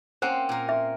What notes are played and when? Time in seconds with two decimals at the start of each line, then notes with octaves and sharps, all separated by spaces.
0.22 A#3 C4 C#4 C5 F#5
0.49 A#2 A#4
0.69 E5